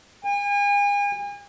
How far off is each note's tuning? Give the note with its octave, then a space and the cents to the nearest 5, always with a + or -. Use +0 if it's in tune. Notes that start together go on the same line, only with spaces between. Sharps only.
G#5 -40